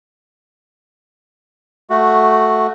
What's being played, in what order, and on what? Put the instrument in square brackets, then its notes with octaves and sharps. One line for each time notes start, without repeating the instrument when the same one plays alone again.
[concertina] A3 F#4